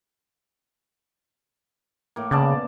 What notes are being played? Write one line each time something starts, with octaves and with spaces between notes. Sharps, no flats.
A2 A#3
C#3 B3 D5 A5